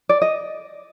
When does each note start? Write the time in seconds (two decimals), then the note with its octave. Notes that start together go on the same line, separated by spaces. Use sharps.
0.09 D5
0.22 D#5